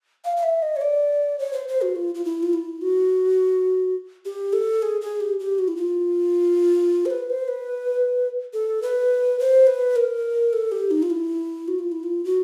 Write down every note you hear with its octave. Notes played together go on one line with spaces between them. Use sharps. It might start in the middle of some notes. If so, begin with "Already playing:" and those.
F5
F5
E5
D#5
C#5
D5
C#5
C5
C5
F#4
F4
F4
E4
F4
E4
F#4
G4
A4
G#4
G#4
G4
G4
F#4
E4
F4
C5
B4
C5
B4
A4
B4
C5
B4
A#4
A4
G4
D#4
F4
E4
F#4
F4
E4
F4
F#4